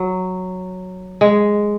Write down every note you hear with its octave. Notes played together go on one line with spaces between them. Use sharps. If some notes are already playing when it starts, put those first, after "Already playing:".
Already playing: F#3
G#3